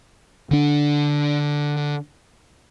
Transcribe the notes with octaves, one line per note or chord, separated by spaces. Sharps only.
D3 D4